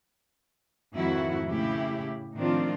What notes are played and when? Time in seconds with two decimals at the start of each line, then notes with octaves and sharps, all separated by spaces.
0.95 F2 G#2 D#3 E4 F#4
1.48 A2 C#3 E4 G4
2.35 A2 D#3 F3 C4 D4 F4